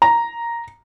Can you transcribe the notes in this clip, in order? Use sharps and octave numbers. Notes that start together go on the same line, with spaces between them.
A#5